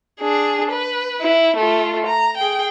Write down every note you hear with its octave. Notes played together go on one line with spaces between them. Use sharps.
D4 G#4
B4
E4
A3 F4
A#5
G#4 G5